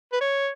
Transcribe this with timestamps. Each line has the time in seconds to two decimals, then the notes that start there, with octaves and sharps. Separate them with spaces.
0.12 B4
0.21 C#5